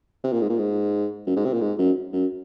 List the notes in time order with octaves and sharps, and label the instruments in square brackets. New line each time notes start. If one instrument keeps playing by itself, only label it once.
[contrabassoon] C3
A#2
G#2
A#2
G#2
F#2
G#2
C3
A#2
G#2
F#2
F#2